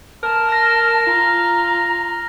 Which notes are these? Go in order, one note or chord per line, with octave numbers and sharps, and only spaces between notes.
A#4 A5
F6 A#6
F4 A#5